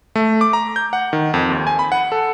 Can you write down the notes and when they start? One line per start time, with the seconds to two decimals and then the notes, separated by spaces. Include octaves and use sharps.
0.16 A3
0.41 D6
0.53 A#5
0.76 G6
0.93 F#5
1.13 D#3
1.34 F2
1.50 D#2
1.67 G#5
1.79 B5
1.92 F#5
2.12 A4